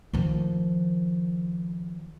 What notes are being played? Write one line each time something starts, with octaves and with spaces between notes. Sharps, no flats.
D#3 F3